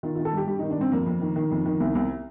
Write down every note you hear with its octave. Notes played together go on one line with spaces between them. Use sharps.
D#3 F4
D#3 F4
A4
G2 G4
G2 G4
D#3 D#4
D4
G2 C4
F2 A#3
F2
D#3
D#3
F2
D#3
C2
C2